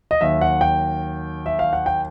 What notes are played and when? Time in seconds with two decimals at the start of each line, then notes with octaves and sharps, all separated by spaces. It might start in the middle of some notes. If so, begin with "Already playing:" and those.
0.11 D#5
0.21 D#2 D#3 F#3 E5
0.41 F#5
0.61 G5
1.46 E5
1.59 F5
1.73 F#5
1.86 G5